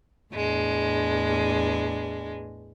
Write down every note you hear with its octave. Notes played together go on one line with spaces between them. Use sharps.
E2 A2 G#3 D4